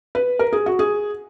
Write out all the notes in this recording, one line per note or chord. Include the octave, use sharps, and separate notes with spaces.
B4
A#4
G#4
F#4
G#4